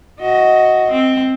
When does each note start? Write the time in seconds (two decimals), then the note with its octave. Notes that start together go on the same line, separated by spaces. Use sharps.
0.20 F#4 D#5
0.91 C4